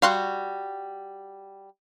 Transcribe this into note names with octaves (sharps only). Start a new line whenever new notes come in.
G3 F#4 F5 C6 F#6